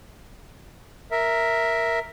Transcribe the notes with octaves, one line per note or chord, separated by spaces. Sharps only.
A#4 E5